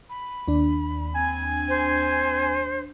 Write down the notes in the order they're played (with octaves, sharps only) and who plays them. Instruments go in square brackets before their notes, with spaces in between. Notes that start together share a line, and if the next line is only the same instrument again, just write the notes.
[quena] B5
[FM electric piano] D#2 D4
[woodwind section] C4 G#5
[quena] C5